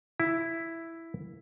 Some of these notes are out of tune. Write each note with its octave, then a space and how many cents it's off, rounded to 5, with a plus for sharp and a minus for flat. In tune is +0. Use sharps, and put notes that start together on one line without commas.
E4 +5